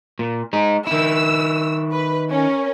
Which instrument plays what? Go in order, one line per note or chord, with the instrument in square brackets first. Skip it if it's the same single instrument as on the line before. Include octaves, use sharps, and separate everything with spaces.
[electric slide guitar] A#2
G#3 D#4
[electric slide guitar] D#3 E4 [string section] E6
[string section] B4
C#4 A#4